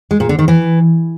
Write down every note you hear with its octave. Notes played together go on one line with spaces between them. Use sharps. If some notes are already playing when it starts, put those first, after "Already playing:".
G#3
A#2
D3
D#3
E3